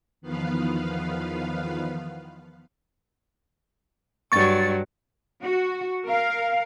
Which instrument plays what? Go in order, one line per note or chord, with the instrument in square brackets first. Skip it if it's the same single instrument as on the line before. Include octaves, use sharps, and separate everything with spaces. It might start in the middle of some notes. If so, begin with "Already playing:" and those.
[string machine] E2 D#3 F3 B3 B4 F5
[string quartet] G2 F#3 [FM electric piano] C#6 A6
[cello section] F#4
A#4 F5